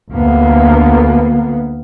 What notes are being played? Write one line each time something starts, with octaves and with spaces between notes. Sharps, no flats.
D2 A#3 B3